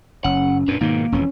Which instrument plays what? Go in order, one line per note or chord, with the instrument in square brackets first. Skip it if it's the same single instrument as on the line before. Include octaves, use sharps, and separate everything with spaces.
[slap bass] F#1 [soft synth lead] C#4 [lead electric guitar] F#5
[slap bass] F#2 A#2 [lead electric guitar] D4 B4
[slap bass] G#2 B2 [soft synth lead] D#3 [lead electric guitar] A#3
[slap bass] E1 F2 E3 [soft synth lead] C#4